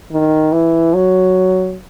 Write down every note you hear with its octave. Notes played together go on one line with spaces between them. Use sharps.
D#3
E3
F#3